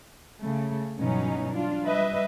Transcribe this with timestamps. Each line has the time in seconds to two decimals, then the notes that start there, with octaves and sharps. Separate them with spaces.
0.42 C#3 A3
0.98 G2 B2 E3 F#3 C#4 D#4
1.52 D4 F4
1.86 G3 B4 D#5 E5